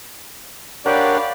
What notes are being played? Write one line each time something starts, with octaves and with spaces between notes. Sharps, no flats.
D4 G4 A#4 C#5 D5 F5 F#5 B5